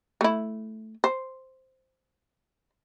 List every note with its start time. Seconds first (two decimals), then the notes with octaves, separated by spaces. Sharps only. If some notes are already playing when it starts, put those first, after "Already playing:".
0.21 A3 E4
1.04 C5